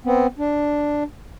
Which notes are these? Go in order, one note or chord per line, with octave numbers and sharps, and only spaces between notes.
B3 C4
D4